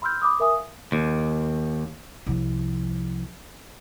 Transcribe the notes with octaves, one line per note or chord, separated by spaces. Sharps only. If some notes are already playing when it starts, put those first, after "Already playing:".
B5 C6 E6 F6 G6
B5 D6 D#6
A#4 E5 G#5 D#6
F5
D#2
C2 F3